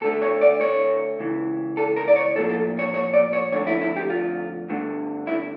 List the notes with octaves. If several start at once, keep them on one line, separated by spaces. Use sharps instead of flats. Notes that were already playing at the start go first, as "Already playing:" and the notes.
D2 D3 A3 A4
C#5
D5
C#5
C#2 C#3 E3
A4
A#4
D5
C#5
A2 F3 A#3 A4
A4
C#5
C#5
D5
C#5
F2 D3 A3 C#5
E4
E4
G4
F4
G2 D3 A3
E4